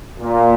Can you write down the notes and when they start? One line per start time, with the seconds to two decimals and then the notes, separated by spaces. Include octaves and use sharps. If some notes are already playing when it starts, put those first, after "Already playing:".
0.19 A#2